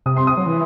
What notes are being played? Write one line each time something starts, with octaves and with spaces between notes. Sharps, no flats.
C3 D#6
C6
D#6
F#3
E3